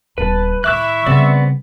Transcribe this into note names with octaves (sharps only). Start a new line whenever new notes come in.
D#1 B3 B4 A5
A2 D#3 E4 E5 C#6 D6 F#6
C#3 G3 B3 C4 D5